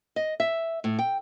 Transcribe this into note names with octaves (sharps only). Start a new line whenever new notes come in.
D#5
E5
A2
G5